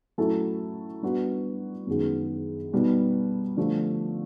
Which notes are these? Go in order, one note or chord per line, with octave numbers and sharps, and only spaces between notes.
F#3 A3 C#4 E4 A4
G3 B3 D4 F#4
F#2 D#3 G#3 B3
B2 G3 B3 D#4
D3 F3 A3 D4 G4